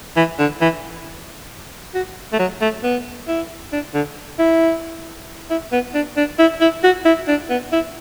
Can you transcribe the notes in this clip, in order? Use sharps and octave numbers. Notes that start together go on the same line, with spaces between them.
E3
D3
E3
F#4
A3
F#3
A3
B3
E4
D4
D3
E4
E4
B3
D4
D4
E4
E4
F#4
E4
D4
B3
E4